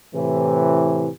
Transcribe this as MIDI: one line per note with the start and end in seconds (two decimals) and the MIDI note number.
0.14 1.08 45
0.14 1.08 48
0.14 1.08 52